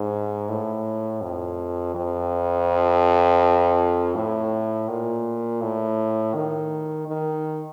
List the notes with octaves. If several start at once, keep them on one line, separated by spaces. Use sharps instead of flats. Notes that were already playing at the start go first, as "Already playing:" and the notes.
Already playing: G#2
A2
F2
F2
A2
A#2
A2
D#3
D#3